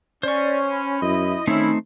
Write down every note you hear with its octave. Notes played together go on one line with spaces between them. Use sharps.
C#4 C5 D5 C#6
B5
F#2 E4 D#5
D#3 A3 C4 C#4 D#4 E4